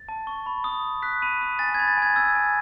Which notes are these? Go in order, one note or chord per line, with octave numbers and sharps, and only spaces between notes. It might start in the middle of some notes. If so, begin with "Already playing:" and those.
Already playing: A6
A5
C#6
B5
D#6
B5
F#6 B6
B5 D#7
D#6
G#5 A6
B5 G#6
A6
G#5 G#6
E6 G#6
G#5